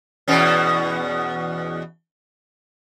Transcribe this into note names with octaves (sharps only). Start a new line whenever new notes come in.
E2 B2 C#4